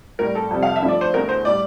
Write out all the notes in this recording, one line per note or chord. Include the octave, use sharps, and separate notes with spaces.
A2 G3 A#4
A4
F2 C3 G3
F5
E5
G2 F3 A3
D5
C5
E2 D3 A3 A#4
C5
A2 G3 D5